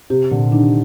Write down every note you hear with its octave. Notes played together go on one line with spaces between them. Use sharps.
C3 G4
A#2 D3
D#3 D4